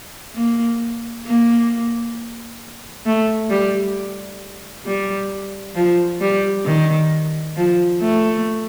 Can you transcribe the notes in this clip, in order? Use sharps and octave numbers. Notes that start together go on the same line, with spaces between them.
A#3
A#3
A3
G3
G3
F3
G3
D#3
F3
A3